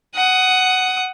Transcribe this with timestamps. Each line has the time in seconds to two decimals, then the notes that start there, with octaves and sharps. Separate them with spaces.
0.15 F#5 D#6